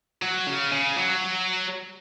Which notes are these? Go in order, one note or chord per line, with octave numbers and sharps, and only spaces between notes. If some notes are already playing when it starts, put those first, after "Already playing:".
F#3
C#3
C#3
F#3